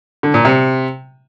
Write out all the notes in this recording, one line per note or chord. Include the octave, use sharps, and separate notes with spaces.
D3
A#2
C3